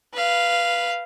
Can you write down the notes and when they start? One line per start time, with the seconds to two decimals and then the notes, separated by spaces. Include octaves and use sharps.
0.13 B4 F5